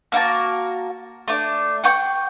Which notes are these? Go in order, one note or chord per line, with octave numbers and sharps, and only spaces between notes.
A#3 F#4 A#4 A5
A3 D4
F#5 G5 C#6